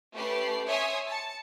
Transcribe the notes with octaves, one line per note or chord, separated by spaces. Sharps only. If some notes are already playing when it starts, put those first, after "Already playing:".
A3 C#4 G4 B4 C7
C#5 E5 G#5 C6 D#6 E6
A5 C#7